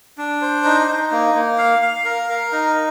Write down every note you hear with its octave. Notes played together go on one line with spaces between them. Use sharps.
D4
C5
D#4
D#4
A#3
A#3
F5
F5
A#4
A#4
D#4